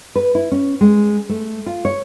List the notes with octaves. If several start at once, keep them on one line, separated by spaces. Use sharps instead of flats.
B4
E4
C#4
G#3
A3
F4
C#5